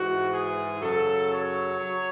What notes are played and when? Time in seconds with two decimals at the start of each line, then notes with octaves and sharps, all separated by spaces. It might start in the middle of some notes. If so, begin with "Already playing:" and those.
Already playing: G#2 E3 F#4
0.31 G#4
0.81 F#2 C#3 F#3 A4
1.31 C#5
1.80 F#3